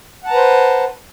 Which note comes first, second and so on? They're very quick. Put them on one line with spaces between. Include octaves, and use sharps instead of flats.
F#5 A5 A#5 B4 C5